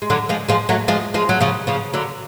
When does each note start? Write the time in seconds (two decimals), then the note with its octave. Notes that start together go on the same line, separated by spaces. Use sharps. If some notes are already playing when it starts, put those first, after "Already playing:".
0.02 G#3
0.10 D3 F#3
0.29 F3 G#3
0.48 F3 G#3
0.69 F#3 A3
0.88 F3 G#3
1.14 F3 G#3
1.29 F#3
1.41 C#3 F3
1.67 C#3 F3
1.93 D3 F#3